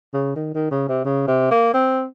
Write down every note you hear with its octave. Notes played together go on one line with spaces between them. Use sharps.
C#3
D#3
D#3
C#3
C3
C#3
C3
A#3
C4